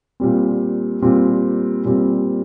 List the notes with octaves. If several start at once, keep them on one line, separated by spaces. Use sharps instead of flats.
A#2 G3 C4
A#2 G3 C4
A#2 G3 C4